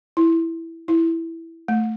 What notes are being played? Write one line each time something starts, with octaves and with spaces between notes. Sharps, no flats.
E4
E4
A3